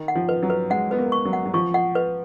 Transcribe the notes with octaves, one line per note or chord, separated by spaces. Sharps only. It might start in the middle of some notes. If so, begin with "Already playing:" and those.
Already playing: D#3
F#5
F3
B4
F#3
B4
G#3 F#5
B3 B4
A#3
C#6
F#3
F#5
F#3
F3 C#6
F#5
B4